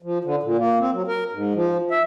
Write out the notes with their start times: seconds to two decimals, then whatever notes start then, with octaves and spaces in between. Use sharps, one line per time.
0.02 F3
0.24 D3
0.43 A#2
0.58 A#3
0.80 C4
0.92 F#3
1.08 A#4
1.32 G#2
1.54 F3
1.91 E5